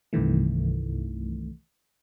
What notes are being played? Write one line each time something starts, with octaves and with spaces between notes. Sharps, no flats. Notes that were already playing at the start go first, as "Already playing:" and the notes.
C2 G2 C3 D#3 E3 A3